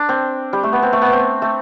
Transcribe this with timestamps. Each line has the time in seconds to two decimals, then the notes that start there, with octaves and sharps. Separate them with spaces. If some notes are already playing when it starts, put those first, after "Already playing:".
Already playing: D4
0.09 C4
0.53 G3
0.63 A3
0.73 B3
0.83 C4
0.93 A3
1.02 B3
1.12 C4
1.42 A3